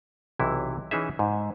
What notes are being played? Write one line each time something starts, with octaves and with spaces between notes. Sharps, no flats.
B1 C3 E3 E4
E3 C#4 D#4 G#4 E5
G#2